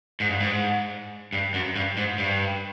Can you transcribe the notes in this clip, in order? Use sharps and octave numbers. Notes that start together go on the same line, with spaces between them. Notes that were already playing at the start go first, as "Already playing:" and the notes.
G#2
G2
G#2
G2
F#2
G2
G#2
G2